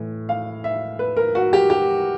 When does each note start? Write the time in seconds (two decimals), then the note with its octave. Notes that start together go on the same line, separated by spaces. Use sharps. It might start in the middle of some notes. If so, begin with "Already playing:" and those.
Already playing: A2 E3
0.29 F5
0.64 E5
0.99 B4
1.17 A#4
1.35 F#4
1.53 G4
1.70 G4